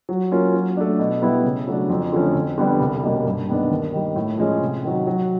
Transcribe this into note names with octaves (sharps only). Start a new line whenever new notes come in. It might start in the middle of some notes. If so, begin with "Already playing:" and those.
F#3
A#3 C#4 F4 A#4
F#3
A3 D4
B2
G3 B3 E4
C#3
F#3 A3 D4
F2
D3 F3 A3 C#4
F2
D3 G3 B3 D4
C2
B2 G3 A#3 C#4
G2
D#3 G#3 B3 D4
D#2
D#3 G3
A2
F3 G#3 C#4
C3
D#3 F#3
F#3